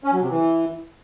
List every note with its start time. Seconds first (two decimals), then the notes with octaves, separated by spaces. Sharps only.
0.04 C#4
0.13 F#3
0.22 C3
0.30 E3